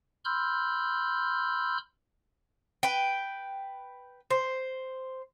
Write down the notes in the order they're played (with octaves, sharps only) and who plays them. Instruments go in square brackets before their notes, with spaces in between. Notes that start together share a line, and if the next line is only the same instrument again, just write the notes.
[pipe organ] B5 C6 E6 F6 G6
[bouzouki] B4 G5
C5